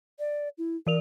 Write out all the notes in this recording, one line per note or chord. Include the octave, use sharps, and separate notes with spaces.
D5
E4
E3 A#4 D5 F7